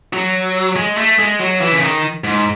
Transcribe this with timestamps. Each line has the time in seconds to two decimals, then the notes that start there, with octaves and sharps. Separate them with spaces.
0.13 F#3
0.76 G#3
0.97 A3
1.19 G#3
1.39 F#3
1.61 E3
1.72 C#3
1.81 D#3
2.24 G#2